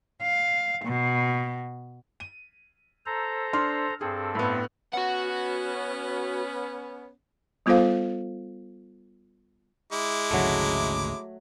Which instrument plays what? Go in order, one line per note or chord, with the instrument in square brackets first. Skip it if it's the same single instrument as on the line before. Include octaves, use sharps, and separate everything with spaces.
[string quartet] F5
B2
[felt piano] D#7
[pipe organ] A4 C5 A#5
[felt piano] D4 C6 F6
[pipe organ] G2 C4 A4 [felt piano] G#4
[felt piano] A2 B3
[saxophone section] B3 C#4 [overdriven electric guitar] F#4 F#5
[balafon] G3 B3 F4 A4 C5 F5
[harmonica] G#3 E4 D6
[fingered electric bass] G#1 D2 C#3 [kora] F#3 A3